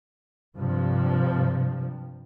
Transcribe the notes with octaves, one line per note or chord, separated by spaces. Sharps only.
G2 C3 F3